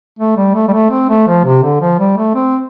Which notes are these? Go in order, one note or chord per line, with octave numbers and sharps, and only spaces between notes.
A3
G3
A3
G3
A3
C4
A3
F3
C3
D3
F3
G3
A3
C4